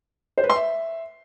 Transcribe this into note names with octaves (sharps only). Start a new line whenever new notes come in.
C5
B4
C6
E5